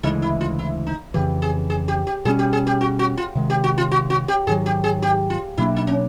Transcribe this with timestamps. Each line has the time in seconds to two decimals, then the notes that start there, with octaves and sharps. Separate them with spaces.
0.03 D2 C#3 E3 G#3 D#4
0.22 E4
0.41 F4
0.59 E4
0.87 D#4
1.14 F2 C#3 E3 G4
1.42 G#4
1.70 G#4
1.88 G4
2.07 G4
2.25 B2 G3 A#3 C#4 G#4
2.39 G4
2.53 G#4
2.67 G4
2.81 F#4
2.99 F#4
3.17 F4
3.35 C3 D#3 G#3
3.50 G4
3.64 F#4
3.78 F4
3.91 F#4
4.10 F#4
4.28 G4
4.47 G#2 D#3 F#3 G#4
4.66 G4
4.84 G#4
5.02 G4
5.30 F4
5.58 B2 F#3 A#3 D4 E4
5.76 D#4
5.87 C#4